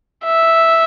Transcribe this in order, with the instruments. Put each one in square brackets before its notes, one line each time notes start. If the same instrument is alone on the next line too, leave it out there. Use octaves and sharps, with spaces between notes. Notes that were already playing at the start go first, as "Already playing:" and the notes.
[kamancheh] E5